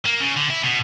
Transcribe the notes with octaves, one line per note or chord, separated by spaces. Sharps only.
A#3
C#3
D3
E4
B2